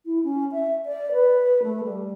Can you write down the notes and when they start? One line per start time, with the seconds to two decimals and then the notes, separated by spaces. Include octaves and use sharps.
0.06 E4
0.24 C#4
0.52 E5
0.86 D5
1.12 B4
1.63 A3
1.84 G3